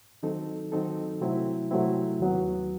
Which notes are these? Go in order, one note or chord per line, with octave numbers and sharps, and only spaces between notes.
D#3 F#3 C4 D#4 A4
D#3 F#3 C4 D#4 A4
C3 F#3 A3 C4 E4
C3 F#3 A3 C4 E4
D#2 D#3 F#3 B3